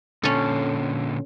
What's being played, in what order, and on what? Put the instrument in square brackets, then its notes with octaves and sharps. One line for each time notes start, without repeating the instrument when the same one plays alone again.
[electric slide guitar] A#2 D3 [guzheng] C#4 A4